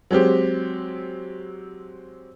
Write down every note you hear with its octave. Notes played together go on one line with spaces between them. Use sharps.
F#3 G#3 C4 G4